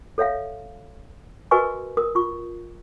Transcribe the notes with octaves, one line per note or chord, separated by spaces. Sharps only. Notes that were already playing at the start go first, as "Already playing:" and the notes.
A4 C#5 E5 F5
F#4 A#4 B4 D#5 G#5 C#6
A#4 D#6
F4 C#6